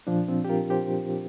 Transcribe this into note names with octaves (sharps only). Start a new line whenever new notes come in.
A#2 F3 D4
C4 F4
G4
F4 A#4
G4 C5